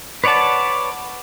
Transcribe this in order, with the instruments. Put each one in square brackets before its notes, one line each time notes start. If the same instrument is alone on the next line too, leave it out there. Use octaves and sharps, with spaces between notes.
[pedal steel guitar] B4 C#5 D5 F#5 A5